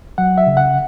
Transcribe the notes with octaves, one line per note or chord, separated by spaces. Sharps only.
F#3 F#5
E5
C#3
F#5